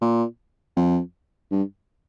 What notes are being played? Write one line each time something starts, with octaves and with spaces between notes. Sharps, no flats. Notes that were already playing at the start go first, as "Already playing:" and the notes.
A#2
F2
G2